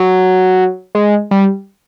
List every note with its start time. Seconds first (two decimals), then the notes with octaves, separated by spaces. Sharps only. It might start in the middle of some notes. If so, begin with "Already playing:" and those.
Already playing: F#3
0.95 G#3
1.31 G3